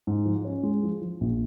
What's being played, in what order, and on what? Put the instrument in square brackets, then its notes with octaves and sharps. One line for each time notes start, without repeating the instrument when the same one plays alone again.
[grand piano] G#2
F3
C#4
G#3
F3
F3
A#1